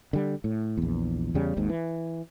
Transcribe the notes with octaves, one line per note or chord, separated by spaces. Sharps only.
D3 G3
A2
A#1 E2
E2 C#3 G3
G#1 D#2 G#2
E3